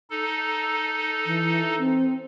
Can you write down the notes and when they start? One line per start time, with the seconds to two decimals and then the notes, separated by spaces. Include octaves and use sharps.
0.10 D#4 A4
1.26 E3
1.79 C4